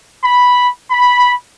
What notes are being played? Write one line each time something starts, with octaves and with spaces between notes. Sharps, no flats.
B5
B5